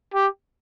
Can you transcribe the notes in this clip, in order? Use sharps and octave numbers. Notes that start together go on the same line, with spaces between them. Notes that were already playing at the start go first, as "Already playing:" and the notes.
G4